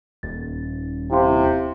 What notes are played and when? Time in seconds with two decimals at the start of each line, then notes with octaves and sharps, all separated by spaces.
0.23 D#1 A6
1.11 C3 E4 F5 C6